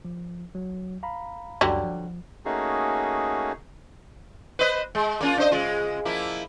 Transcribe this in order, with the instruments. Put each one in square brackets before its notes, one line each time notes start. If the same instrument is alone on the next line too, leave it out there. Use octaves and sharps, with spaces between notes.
[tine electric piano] F3
F#3
F5 A#5 B5
[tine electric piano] C#2 F#2 [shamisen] D3 F#3 G3
[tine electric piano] F3
[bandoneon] A3 A#3 C#4 D#4 F#4 G#4
[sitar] B4 C5 D#5
G#3
A#3 C#4 F4
D4 C5 D#5
C#3 G#3 F4
F3 A#3 E4